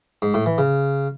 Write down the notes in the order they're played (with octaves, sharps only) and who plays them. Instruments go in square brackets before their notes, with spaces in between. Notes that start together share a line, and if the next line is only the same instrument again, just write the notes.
[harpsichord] G#2
A2
E3
C#3